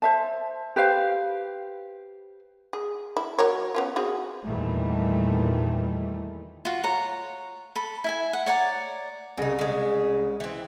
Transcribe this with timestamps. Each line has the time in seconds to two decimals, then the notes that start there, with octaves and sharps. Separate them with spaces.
0.02 C5 E5 A5
0.76 G4 B4 C5 F5
2.73 G#4
3.17 E4
3.38 F#3 A#4 C#5
3.74 B3 C#4 F4
3.96 C4 F#4 G#4
4.45 E2 A#2 D#3 E3 G3 A3
6.65 F4 F#4
6.83 C#5 F#5 A#5
7.76 A4 B5
8.04 E4 E5 G#5
8.33 F#5
8.46 C#5 D5 F#5 A#5
9.37 C2 C#3 D#4 G#4 A#6
9.59 C#3 G#3
10.40 E3 C4